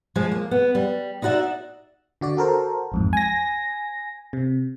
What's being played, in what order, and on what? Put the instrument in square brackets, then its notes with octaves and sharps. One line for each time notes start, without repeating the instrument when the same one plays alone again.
[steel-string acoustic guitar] F3 G#3
A#3
B3
G3
D#4 E4 F#4 D5 E5
[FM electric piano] D3 F#4 D5
F#4 A4 A#4 C5
A1 F2 G#2
G#5 A#6
C3